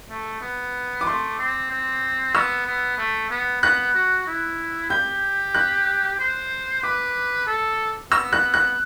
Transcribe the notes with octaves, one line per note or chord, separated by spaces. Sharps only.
A3
B3
D6
A3 C6
C4
C4
B3 E6
B3
A3
B3
B3 F#6
F#4
E4
G4 G6
F#6
C5
B4 D6
A4
B3 E6
F#6
F#6